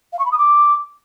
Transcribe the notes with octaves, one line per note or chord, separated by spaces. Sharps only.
F5
C#6
B5
D#6
D6